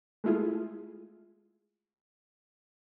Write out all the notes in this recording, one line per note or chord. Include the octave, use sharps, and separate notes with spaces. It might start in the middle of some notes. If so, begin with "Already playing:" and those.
G#3 A3 E4 F4 G#4